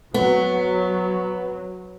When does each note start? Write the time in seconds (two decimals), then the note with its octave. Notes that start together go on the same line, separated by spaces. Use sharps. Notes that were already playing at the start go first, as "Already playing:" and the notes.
0.14 F#3 B3